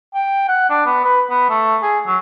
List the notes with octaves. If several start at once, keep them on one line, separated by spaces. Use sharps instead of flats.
G5
F#5
D4
B3
B4
B3
A3
G#4
F#3